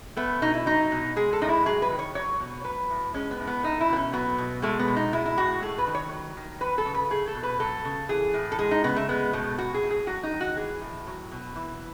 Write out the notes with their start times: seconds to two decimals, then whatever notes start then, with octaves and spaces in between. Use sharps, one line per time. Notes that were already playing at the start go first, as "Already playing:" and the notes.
0.17 A3 B3
0.42 B2 D#4
0.54 E4
0.66 F#3 D#4
0.92 B2
1.16 G#3 G#4
1.33 A4
1.41 A2 D#4
1.49 E4
1.65 F#3 G#4
1.82 B4
1.90 D#3
1.99 C#5
2.15 F#3 C#5
2.40 B2
2.64 F#3 B4
2.90 A2
3.14 G#3 C#4
3.31 B3
3.39 A2
3.47 B3
3.63 A3 D#4
3.81 E4
3.89 B2 B3
3.96 C#4
4.13 F#3 B3
4.38 B2
4.62 G#3 A3
4.79 B3
4.88 B2
4.96 D#4
5.13 G#3 E4
5.26 E4
5.37 A2 F#4
5.62 A3 G#4
5.78 B4
5.87 D#3
5.95 C#5
6.12 F#3
6.37 D#3
6.61 F#3 B4
6.78 A4
6.85 C#3
6.94 B4
7.10 A3 G#4
7.28 A4
7.35 B2
7.43 B4
7.60 F#3 A4
7.85 C#3
8.09 E3 G#4
8.34 A2
8.52 A4
8.59 G#3 G#4
8.71 D#4
8.84 C#3 B3
8.96 A3
9.09 G#3 B3
9.33 B2 A3
9.58 F#3 F#4
9.74 G#4
9.83 A2
9.91 G#4
10.07 F#3 F#4
10.23 D#4
10.32 D#3
10.41 F#4
10.57 E3 G#4
10.81 A2
11.07 F#3
11.32 B2
11.56 E3